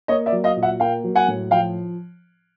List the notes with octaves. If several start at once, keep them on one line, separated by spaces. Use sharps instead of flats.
A#3 C#5 D#5
D5 E5
F#3
D#5 F5
A#2
E5 F#5
A#3 F5 G5
F#3
F#5 G#5
A2
F3 F5 G5